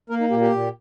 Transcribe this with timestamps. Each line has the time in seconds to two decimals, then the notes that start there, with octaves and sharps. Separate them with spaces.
0.10 A#3 A#4
0.20 D#4
0.30 A#2 G4
0.41 G4
0.52 A#2